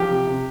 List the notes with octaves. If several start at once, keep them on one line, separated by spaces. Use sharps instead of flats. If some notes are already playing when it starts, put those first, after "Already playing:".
Already playing: F3 G4
C3
C3